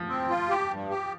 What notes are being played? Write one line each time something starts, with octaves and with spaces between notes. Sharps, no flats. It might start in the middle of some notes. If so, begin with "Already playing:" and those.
Already playing: F3
C4
F4
G4
G2
G4